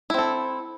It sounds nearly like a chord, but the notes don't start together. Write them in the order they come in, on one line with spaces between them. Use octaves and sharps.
E4 C4 A4